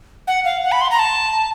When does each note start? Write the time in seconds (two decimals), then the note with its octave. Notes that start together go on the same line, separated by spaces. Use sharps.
0.27 F#5
0.45 F5
0.64 F#5
0.72 B5
0.81 C6
0.91 A#5
0.99 A5